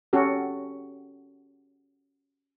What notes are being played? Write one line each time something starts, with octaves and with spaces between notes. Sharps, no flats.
C#4 F#4 G4 A4